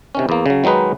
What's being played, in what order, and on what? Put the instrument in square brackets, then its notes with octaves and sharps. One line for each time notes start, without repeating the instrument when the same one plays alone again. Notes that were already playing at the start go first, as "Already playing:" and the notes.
[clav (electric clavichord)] C3 D#3 C#4
E2 A#3
C#3 F#3
D#3 F#3 G#3 D#4 B4